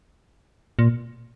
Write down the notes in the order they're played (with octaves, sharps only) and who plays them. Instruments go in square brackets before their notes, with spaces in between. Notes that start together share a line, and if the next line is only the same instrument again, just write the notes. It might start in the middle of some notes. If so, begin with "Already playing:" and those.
[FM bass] A#2